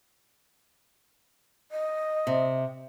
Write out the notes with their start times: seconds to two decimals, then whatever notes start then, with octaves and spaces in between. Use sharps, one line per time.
1.72 D#5
2.27 C3